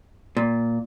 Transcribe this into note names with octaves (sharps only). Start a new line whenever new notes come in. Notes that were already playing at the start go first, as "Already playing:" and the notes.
A#2